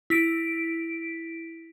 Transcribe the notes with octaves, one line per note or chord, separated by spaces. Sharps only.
E4 B6 D7